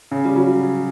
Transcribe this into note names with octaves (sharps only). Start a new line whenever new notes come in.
C#3
G3
F#3